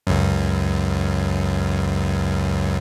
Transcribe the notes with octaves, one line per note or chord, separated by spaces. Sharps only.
C#2 F#2